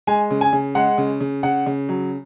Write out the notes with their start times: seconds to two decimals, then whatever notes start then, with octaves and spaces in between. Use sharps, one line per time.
0.07 G#3 G#5
0.31 C#3
0.41 G#5
0.53 C#3
0.75 G#3 F#5
0.98 C#3
1.20 C#3
1.43 C#3 F#5
1.66 C#3
1.89 F#3